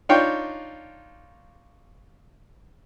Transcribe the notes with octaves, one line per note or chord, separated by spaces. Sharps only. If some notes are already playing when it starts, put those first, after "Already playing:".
D4 D#4 F4 C#5 G5